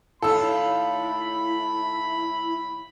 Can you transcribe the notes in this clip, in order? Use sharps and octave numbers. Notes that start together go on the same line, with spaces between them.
D#2 A2 E4 F4 A4 B5 E6